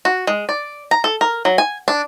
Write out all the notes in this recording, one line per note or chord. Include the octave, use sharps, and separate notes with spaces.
F#4
G#3
D5
A#5
A4
A#4
F#3
G#5
D4